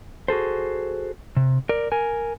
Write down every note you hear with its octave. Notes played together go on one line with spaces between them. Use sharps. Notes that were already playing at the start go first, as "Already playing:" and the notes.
F#4 G#4 A4 C5
C3
A#4 D5
A#4 G#5